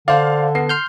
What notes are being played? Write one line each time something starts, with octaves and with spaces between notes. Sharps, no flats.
D3 C5 D5 F5
B3 C7
C6 F6 G6